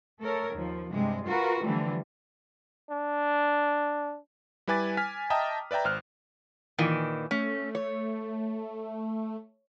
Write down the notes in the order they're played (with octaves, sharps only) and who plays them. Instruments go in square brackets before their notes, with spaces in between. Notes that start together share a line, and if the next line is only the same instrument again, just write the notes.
[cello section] A3 A4 A#4 C#5
D#2 F3
G2 C3 G#3
F4 F#4 A#4 B4
D3 E3 F3 G3 A3
[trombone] D4
[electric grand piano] G3 E4 B4 G#5 D6 A6
G#5 F6 B6
D#5 E5 G5 A5 A#5 D#6
B4 D5 E5 G5 A#5
G#1 C5 F6 F#6
[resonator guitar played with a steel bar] A#2 D#3 E3
[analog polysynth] A3 [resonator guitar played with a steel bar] C#4
[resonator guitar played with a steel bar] C#5